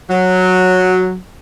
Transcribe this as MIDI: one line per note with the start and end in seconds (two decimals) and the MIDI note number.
0.10 1.17 54